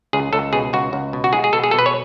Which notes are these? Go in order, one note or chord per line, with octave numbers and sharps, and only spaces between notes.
C#2 G#4
C#2 A4
B2 G#4
C#2 F#4
C#2
B2
F#4
G#3 G#4
G#4
B2 A4
G#4
B2 A4
B4
C#5